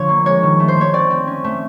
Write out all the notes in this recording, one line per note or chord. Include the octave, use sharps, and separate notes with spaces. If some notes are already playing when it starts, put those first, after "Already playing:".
Already playing: D3 F3 C#5
A#3
G#3 C#5
D#3
A3
C5
A3 C#5
C4 D5
C4
C#4
A3